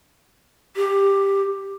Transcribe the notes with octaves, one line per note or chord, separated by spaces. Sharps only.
G4